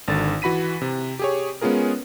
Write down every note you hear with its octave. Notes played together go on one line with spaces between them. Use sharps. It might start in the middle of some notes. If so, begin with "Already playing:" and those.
G#1 D3 A6
E3 F#4 B5 B6 D#7
C3
G4 G#4 C#5
G#3 B3 C#4 F4 G#4 A#4